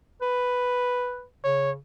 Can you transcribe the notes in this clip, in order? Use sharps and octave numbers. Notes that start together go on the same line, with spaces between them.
B4
C#3 C#5